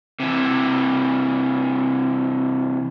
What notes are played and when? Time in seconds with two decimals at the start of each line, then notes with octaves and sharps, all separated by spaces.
0.20 C3 E3